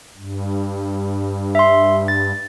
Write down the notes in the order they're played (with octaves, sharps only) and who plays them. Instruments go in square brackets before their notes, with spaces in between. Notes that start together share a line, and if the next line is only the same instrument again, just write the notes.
[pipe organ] G2
[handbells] E5 C6
A6